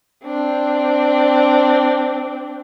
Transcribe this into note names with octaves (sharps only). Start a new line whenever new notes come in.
C4 D4